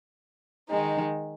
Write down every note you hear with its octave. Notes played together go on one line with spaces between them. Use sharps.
D#3 G#3 D#4